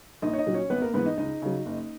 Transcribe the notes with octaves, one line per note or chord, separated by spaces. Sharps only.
A#1 D#4 D#5
C#5
D#4 D#5
A#2 F#3
C#4 C#5
G#1 B3 B4
A#3 A#4
G#2 E3 B3 B4
D#4 D#5
C#2 D#4 D#5
C#3 F#3
F#1